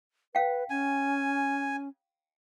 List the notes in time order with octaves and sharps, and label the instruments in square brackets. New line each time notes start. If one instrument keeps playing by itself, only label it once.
[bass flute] B4 [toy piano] F5 G5
[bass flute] C#4 [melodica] G#5